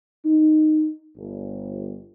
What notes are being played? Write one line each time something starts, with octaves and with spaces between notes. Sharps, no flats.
D#4
G1